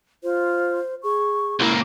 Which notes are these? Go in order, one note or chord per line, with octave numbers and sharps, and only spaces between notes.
F4 C5
G#4 C#6
C#2 A#3 E4